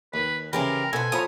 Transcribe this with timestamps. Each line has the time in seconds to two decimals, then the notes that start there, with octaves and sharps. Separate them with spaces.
0.14 D#2 B4
0.53 C#3 E3 G4 G#4 A#4 C5 B5
0.93 B2 A4 C5 F#5 G#5 B5
1.12 F3 C#5 A#5 B5 D#6